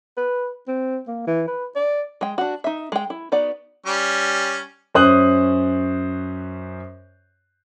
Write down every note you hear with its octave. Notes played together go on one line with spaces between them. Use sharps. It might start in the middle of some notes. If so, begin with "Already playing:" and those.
B4
C4
A#3
E3
B4
D5
G#3 G5
D4 F#4
D#4 E5
G#3 G5
E4
B3 D#4 F#4 D5
G3 C#4
F#2 C#4 C5 D#6 F#6 F#7